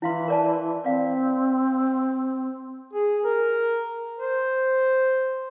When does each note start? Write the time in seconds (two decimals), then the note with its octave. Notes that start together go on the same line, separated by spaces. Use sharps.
0.02 E3 E4 F5 C6
0.28 A#4 D5 A5
0.84 C4 D5 F5
2.93 G#4
3.25 A#4
4.19 C5